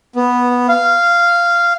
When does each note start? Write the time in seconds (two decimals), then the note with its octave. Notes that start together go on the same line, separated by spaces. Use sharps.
0.16 B3
0.69 F5